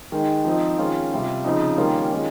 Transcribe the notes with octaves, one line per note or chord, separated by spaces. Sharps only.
D#3 G#3 D#4
F3 C4 D#4
D#3 G#3 C#4 F4
C3 G3 C4 F4
C#3 F3 C4 D#4
D#3 G3 A#3 C#4 F4
D#3 G#3 C#4 F4